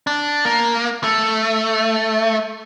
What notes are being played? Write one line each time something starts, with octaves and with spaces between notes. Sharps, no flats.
D4
A#3
A3